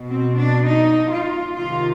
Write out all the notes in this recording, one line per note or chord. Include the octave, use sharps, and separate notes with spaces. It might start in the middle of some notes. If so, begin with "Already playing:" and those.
Already playing: B2
C4
D4
D#4
F4
C3 D#3 F4